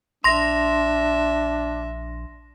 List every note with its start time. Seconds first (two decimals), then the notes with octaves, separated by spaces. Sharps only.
0.24 A#1 D4 E5 C6 A#6